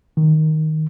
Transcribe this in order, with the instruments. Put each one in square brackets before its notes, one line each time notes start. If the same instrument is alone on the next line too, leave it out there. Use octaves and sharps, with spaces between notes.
[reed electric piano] D#3